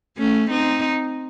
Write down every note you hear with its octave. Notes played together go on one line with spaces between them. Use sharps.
A3 C#4
C4 D#4